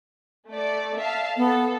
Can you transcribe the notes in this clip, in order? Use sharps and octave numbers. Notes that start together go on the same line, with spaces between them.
A3 D5
E5 F5 A5
B3 A4